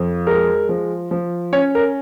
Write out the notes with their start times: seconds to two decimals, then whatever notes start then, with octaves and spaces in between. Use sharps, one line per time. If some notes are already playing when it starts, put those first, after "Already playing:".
Already playing: F2 F4
0.27 G#3 A#4
0.69 F3
1.11 F3
1.53 C#4 C#5
1.75 A#4